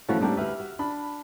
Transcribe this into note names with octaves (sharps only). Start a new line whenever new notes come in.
E3 F3 A3 C#4 E4 F#4 A5
A2 G3 A#3 C4 D4 G4
D2 G4 B4 E5 F6
F#4
D4 B5